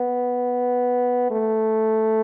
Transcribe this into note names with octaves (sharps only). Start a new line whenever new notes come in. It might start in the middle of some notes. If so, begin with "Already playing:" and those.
Already playing: B3
A3